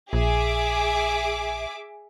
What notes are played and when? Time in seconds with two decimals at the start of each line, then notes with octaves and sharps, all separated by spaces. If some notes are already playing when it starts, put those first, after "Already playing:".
0.13 A#1 G#4 E5 D6